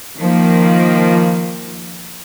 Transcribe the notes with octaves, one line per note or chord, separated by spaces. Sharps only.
D#3 F3 A#3